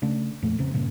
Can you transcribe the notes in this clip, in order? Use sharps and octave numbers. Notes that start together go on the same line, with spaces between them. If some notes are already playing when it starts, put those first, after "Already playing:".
C#3 A3 D4
F2 A#2 A3
F1 C#3 C4
G2 A#2 C#3